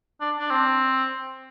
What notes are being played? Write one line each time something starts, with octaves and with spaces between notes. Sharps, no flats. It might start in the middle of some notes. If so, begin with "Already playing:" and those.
D4
D4
C4